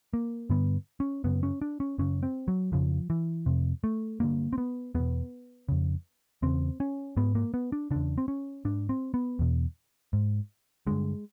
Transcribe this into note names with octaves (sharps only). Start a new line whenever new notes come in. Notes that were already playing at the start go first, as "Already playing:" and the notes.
A#3
G2 D3 B3
C#4
F#2 C#3 B3
C#4
D4
C#4
F#2 C#3 C#4
C4
F#3
F2 C#3 F3
E3
F2 C3
A3
G2 D3 A#3
C4
B3
E2 B2 B3
F2 C#3
E2 C#3 C4
C#4
G#2 B3
A#3
B3
D4
E2 C#3 D4
C4
C#4
G#2 D4
C4
B3
E2 B2
G#2
G2 D3 G#3